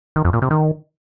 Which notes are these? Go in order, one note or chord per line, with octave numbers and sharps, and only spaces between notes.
D#3
F2
A#2
C3
D#3